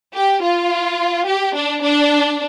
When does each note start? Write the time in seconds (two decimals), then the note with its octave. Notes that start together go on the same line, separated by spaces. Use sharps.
0.14 G4
0.42 F4
1.26 G4
1.55 D4
1.83 D4